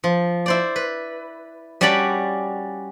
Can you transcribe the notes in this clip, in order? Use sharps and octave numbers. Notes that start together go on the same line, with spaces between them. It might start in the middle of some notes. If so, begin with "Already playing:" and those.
F3
E4 C5 D5
B4
G3 C#4 F#4 D5 A5 B5